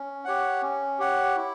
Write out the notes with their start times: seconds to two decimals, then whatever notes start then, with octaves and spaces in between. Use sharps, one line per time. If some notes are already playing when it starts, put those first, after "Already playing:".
Already playing: C#4
0.25 G4 C#5 F#5
0.62 C#4
0.99 G4 C#5 F#5
1.36 E4